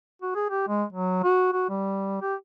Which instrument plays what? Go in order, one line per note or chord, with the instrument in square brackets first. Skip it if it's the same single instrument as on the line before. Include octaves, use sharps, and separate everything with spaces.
[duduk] F#4
G#4
G4
G#3
F#3
F#4
F#4
G3
G4